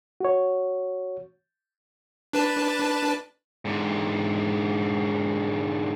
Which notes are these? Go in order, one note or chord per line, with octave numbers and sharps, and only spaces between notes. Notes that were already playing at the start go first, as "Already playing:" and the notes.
F#4 C#5
D4 B4 A5
G#2 D3